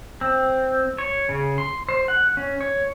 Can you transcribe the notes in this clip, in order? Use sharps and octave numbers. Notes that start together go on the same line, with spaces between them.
C4
C#5
C#3
C6
C5
F#5
C#4
C#5